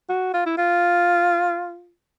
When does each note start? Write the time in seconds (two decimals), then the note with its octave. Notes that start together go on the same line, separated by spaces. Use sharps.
0.09 F#4
0.34 F4
0.46 E4
0.57 F4